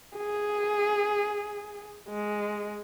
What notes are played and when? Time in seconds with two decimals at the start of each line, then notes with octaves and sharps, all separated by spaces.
0.17 G#4
2.09 G#3